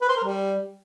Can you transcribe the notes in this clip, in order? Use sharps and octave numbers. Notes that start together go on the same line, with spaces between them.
B4
C5
A#4
G3